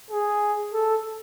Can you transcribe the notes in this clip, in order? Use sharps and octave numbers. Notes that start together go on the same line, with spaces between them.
G#4
A4